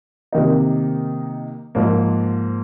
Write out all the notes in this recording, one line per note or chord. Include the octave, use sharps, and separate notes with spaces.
C3 D#3 A#3 D#4
G#2 F3 A#3